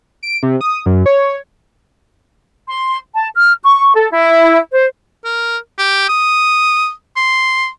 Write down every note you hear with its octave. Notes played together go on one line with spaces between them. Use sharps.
D7
C3
D#6
F#2
C#5
C6
A5
F6
C#6
A4
E4
C5
A#4
G4
D#6
C6